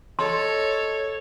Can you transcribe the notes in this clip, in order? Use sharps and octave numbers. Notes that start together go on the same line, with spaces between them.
A4 C#5 D#5 C6